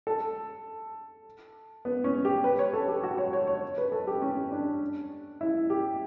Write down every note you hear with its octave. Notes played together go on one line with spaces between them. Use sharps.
A4
B3
C#4
G4
B4
C#5
A4
G4
F#4
C#5
C#5
C#5
B4
A4
G4
C#4
D4
E4
G4